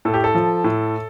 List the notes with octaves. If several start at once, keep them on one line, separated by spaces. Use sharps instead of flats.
A2 A4
G4
A4
F3
A2